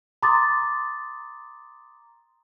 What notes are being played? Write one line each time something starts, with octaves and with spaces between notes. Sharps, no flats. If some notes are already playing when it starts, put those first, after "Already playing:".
A#5 C6 D6 D#6 A6